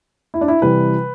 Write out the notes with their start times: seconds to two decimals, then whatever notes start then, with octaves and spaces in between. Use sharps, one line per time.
0.34 E4
0.41 D4
0.48 E4
0.62 C3 E3 G3 B4